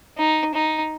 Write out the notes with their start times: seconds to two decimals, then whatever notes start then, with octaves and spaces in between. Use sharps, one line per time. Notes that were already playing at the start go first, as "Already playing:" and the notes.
0.17 D#4
0.54 D#4